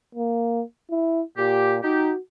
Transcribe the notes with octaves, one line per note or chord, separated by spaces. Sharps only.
A#3
E4
A#2 G4
D#4 F#4 G4